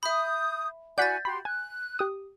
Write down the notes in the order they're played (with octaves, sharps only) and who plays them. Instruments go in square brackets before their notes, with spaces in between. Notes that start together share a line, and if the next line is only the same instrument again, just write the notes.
[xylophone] E5 B5 [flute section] D#6 G6
[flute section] E4 F#4 G#5 [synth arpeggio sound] D5 F#5 B6 [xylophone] G6 A6
[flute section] F#4 G4 C6 [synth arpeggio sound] B5
[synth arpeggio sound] G#5 [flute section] F#6
[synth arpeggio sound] G4 D#6